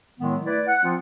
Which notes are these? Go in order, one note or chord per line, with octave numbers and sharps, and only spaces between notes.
A2 D#3 F#3 G#3 B3
A3 E4 B4 D5
F#5
F3 C4 F4